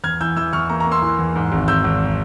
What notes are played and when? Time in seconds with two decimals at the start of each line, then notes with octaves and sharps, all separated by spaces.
0.04 E2 F6 G#6
0.21 E3 E6 G6
0.37 E3 E6 G6
0.53 E2 C#6 F6
0.69 A#3 A#5 C#6
0.80 A#5 C#6
0.86 A#3
0.92 C6 E6
1.02 E3
1.19 E2
1.36 G#2
1.52 G#1
1.68 G#1 E6 G6
1.84 G#1